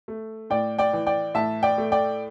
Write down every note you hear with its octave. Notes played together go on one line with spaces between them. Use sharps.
A3
A2 D5 G5
D5 G5
E3
D5 G5
A2 E5 A5
D5 G5
A3
D5 G5